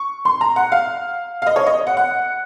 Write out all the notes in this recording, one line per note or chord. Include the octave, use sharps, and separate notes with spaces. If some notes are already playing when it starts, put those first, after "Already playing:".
Already playing: C#6
C6
A#5
F#5
F5
F5
D#5
C#5
D#5
F#5
F#5